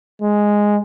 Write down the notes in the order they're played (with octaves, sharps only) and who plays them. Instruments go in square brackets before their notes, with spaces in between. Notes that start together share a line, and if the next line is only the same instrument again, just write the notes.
[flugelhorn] G#3